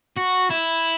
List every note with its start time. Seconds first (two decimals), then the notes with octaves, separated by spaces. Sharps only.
0.17 F#4
0.50 E4